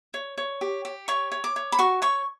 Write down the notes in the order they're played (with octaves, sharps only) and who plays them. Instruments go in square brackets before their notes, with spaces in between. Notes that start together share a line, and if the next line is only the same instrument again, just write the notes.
[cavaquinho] C#5
C#5
G4
G4
C#5 C#6
C#5
D6
C#5
B5
F#4 C#6
C#5 C#6